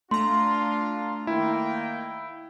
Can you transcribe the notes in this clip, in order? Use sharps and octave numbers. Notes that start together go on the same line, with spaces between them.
A3 D4 F4 A#5 C6
D#3 A#3 E4 G5